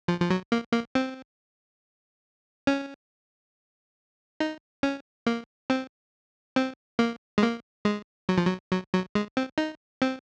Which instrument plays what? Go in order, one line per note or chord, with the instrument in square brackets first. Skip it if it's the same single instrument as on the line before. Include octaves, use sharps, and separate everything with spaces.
[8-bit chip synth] F3
F3
F#3
A#3
A#3
C4
C#4
D#4
C#4
A#3
C4
C4
A#3
G#3
A#3
G#3
F#3
F3
F#3
F#3
F#3
G#3
C4
D#4
C4